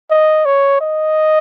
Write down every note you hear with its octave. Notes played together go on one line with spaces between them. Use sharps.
D#5
C#5
D#5